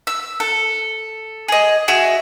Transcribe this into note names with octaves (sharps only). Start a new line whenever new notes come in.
E6
A4
G#4 D#5
F#4 G#4 E5